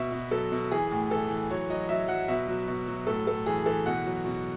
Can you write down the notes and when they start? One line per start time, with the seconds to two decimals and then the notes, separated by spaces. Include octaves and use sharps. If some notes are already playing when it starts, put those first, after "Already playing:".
Already playing: B2 E5
0.12 B2
0.31 F#3 A4
0.52 B2
0.71 E3 G#4
0.91 A2
1.10 E3 A4
1.30 E3
1.50 F#3 C#5
1.70 F#3 D#5
1.89 F#3 E5
2.08 F#3 F#5
2.28 B2 E5
2.48 F#3
2.68 B2
2.88 F#3
3.07 A2 A4
3.27 A2 A4
3.46 E3 G#4
3.66 E3 A4
3.86 B2 F#5
4.06 F#3
4.25 B2